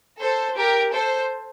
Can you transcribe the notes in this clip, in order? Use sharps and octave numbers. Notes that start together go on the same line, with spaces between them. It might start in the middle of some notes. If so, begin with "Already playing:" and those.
A4 C5
G4 A#4
A4 C5